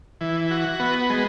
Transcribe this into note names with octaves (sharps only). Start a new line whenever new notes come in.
E3
F#4
B3
G#3